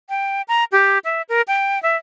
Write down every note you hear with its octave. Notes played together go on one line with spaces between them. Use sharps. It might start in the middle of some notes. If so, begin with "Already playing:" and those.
G5
A#5
G4
E5
A#4
G5
E5